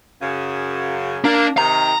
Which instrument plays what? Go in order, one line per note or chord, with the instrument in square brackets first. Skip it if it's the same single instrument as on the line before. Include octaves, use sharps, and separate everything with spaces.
[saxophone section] F#2 C#3
[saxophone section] A#3 [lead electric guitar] D4
[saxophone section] C3 D#3 [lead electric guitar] A#5